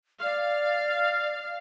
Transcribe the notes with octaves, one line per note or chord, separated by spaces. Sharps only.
D5 F5